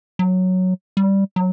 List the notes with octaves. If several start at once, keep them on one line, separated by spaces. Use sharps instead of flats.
F#3
G3
F#3